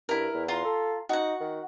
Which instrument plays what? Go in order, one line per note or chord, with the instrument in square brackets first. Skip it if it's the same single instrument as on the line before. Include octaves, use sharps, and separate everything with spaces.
[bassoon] G2 [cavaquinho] E4 A#4
[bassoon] E2
[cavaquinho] F4 A#5 C6
[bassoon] A4
[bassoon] D#4 [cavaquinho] F#4 F#5
[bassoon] D#3